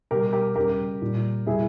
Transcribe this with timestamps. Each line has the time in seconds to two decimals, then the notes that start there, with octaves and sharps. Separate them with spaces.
0.11 B2 G3 G4 A#4
0.33 G4 A#4
0.55 C#3 G3 G4 A#4
1.02 A#2 G3
1.46 B2 G3 E4 G#4